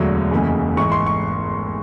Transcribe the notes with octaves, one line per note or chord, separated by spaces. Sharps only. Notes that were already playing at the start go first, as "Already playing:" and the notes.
Already playing: E1 D2 D3 F#3
F1 D#2 C#3 E3
G#1 G#2 E3 C#6
C6
C#6